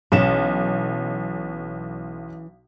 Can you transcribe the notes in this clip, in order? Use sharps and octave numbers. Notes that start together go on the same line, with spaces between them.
B1 E3 C#4 E7